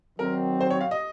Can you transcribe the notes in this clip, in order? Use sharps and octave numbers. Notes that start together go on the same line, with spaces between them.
D#3 F#3 C4 A#4
C5
C#5
F5
D#5